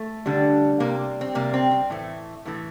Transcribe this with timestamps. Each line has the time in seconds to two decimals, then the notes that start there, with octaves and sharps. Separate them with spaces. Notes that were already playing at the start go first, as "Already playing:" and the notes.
Already playing: A3
0.26 D3 G3
0.80 C3 G3 A#3
1.21 C4
1.35 C3 G3 A#3
1.54 C4
1.71 C4
1.90 A2 E3 A3
2.45 A2 E3 A3